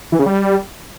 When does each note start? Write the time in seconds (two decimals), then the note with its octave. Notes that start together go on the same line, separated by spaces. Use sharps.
0.12 E3
0.19 C#3
0.26 G3